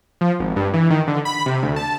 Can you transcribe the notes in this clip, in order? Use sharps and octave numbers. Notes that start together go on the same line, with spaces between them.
F3
G#1
G2
E3
D#3
D3
B5
C3
D2
A5